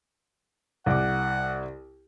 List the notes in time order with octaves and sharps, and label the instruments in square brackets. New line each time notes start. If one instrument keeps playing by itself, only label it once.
[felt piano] C2 D6 [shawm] F#5